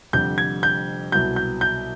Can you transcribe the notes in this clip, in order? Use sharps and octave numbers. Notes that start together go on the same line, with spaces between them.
F1 F2 D3 G3 G6
G#6
G6
C2 B2 F#3 G6
G6
G6